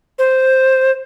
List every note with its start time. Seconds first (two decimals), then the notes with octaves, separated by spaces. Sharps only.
0.19 C5